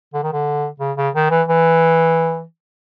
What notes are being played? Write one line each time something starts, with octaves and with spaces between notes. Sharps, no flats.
D3
D#3
D3
C#3
C#3
D#3
E3
E3